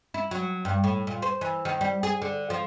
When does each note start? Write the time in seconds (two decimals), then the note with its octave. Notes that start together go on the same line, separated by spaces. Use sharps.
0.14 E4
0.31 F#3
0.65 G2
0.84 A2
1.07 A#2
1.22 C5
1.41 E3
1.65 D#3
1.81 G3
2.03 G#4
2.22 D3
2.50 F3